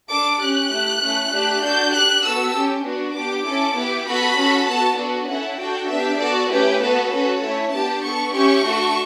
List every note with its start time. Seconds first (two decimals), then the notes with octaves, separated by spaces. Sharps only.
0.10 D4 A4 D6
0.40 C#4 G4 F#6
0.71 A3 E4 G4
1.01 A3 C#4 E4
1.32 A3 D4 G4
1.62 D4 F#4 A4 G6
1.93 D4 G4 F#6
2.23 B3 F#4 A4 E6
2.54 C#4 G4
2.85 B3 D4 F#4
3.14 B3 D4 G4 D6
3.46 C#4 E4 A4
3.75 B3 E4 G4
4.07 B3 F#4 A4 B5
4.37 C#4 F#4 A4
4.67 B3 F#4 A4 A5
4.97 B3 D4 F#4 A4
5.28 C#4 E4 A4 F#5
5.58 D4 F#4 A4 G5
5.89 B3 D4 G4 E5
6.19 B3 F#4 A4 D5
6.50 A3 C#4 E4 G4 B4
6.81 B3 F#4 A4
7.11 C#4 F#4 A4 B4
7.41 A3 C#4 E4 C#5
7.72 B3 D4 G4 A5
8.02 B3 D4 A4 C#6
8.33 C#4 E4 G4 C#6
8.64 A3 D4 F#4 A4